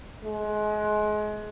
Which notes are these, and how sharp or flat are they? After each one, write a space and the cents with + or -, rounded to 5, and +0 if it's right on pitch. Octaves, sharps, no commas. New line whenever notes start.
G#3 +30